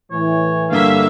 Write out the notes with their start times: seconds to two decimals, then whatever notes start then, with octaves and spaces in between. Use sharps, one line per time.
0.12 A2 E3 C#5
0.70 G2 D3 A#3 E5 F5